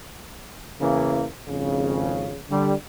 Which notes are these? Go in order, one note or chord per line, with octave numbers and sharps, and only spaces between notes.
E2 C#3 E3 A#3
G#1 F2 C#3
D3 G3